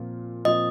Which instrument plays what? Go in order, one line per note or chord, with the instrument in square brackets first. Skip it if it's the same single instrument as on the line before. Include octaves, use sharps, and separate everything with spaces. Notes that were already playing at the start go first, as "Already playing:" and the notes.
Already playing: [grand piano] A#2 F3 C4 F4
[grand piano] A#2 F3 C4 F4 [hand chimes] D#5